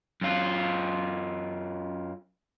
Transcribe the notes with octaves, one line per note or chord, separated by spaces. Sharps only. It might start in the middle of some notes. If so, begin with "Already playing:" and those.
F#2 F4